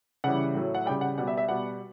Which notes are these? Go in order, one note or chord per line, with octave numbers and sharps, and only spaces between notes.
C#3 E3 G3 F#5
A2 F#3
F#5
C#3 G3 G5
F#5
B2 G3 F#5
E5
E5
B2 G3 F#5